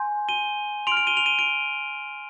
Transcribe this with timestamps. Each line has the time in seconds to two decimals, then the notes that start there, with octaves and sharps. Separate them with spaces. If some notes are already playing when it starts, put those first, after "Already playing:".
Already playing: G#5 C6 G6
0.29 D#7 G7
0.87 C6 D7 F7
0.92 F6
0.97 D7 F7
1.07 D#7 G7
1.17 D7 F7
1.26 D#7 G7
1.39 D7 F7